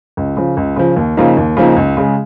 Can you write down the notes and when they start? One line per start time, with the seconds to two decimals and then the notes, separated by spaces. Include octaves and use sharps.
0.17 C#2
0.37 C#3 F3
0.57 C#2
0.76 C#3 F3
0.97 D#2
1.17 C#3 F3 A#3 D#4
1.37 D#2
1.57 C#3 F3 A#3 D#4
1.77 C#2
1.97 C#3 G#3